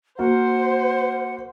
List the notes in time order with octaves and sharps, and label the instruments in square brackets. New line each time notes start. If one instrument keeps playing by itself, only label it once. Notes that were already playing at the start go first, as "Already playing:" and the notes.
[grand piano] A#3 F#4 A#4 [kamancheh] C5 [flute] F#5